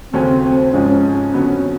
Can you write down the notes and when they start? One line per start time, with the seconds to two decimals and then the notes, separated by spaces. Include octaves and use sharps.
0.12 D#2 C#3 F#3 A3 C4 C#4
0.43 C4
0.73 G#2 F3 G#3 C#4
1.33 F2 D3 F#3 B3